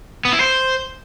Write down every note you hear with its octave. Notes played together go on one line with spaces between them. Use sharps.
B3
E4
C5